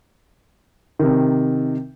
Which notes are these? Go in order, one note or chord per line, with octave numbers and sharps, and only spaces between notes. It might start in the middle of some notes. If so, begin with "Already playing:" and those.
C3 D#3